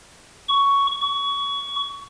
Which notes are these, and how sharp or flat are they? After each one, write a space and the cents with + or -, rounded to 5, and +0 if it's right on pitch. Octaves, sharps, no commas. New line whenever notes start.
C#6 +10
C#6 +25